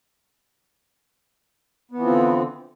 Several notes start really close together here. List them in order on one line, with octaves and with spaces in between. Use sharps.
B3 E3 F3 C4 D3